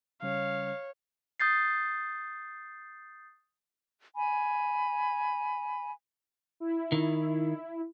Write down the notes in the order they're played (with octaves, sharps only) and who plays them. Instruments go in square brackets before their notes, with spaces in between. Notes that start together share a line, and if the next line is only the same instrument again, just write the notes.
[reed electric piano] C#3 G3 C#4 [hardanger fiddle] C#5 [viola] F5
[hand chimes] D#6 G6 A6 C7
[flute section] G#5 B5
[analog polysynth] E4
[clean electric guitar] D#3